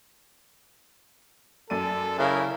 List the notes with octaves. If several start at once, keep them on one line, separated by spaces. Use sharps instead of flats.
F#2 A4 D5 D#7
C#3 E4 A#4